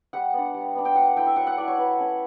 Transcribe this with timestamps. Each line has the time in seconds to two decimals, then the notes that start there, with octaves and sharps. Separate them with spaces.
0.13 G3 F#5
0.33 B3 D4
0.54 G3
0.75 B3 D4
0.85 G5
0.95 F#3 F#5
1.16 A3 E4 G5
1.27 E5
1.36 F#3 F#5
1.47 F#5
1.57 A3 E4 D5
1.68 C#5
1.78 F#3 B4
1.98 A3 C#4